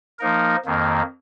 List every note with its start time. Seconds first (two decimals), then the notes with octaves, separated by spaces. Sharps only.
0.19 F3 A#3 D#4 A#4
0.65 F2 D#3 A#3